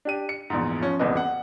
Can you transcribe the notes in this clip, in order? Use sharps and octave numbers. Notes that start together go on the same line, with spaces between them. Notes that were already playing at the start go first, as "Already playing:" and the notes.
D4 G4 D#7
C#7
A#1 E2 G#2
F3 C#4
D#1 G#1 E2 B4 D#5
F#5